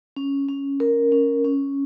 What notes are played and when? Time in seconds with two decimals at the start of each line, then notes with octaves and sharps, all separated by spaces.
0.17 C#4
0.49 C#4
0.80 A#4
1.12 C#4
1.44 C#4